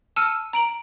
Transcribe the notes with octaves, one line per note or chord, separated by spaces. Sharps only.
A5 E6 F6 C#7 D#7
A#5 D7 F#7